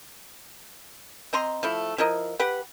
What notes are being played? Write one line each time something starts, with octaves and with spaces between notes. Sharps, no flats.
C4 D#5 A#5 C6
F3 A3 E4
F3 E4 A#4 D#5
G4 B4 F#5